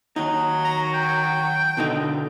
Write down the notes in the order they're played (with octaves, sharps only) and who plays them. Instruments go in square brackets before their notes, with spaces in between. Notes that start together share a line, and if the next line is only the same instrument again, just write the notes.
[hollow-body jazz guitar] D#2 D#4 [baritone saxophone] F#3
[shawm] A#5
G5
[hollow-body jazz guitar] B2 D3 D#4